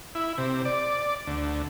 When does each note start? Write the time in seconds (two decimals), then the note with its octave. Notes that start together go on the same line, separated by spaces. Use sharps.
0.15 E4
0.38 C3
0.65 D5
1.27 D2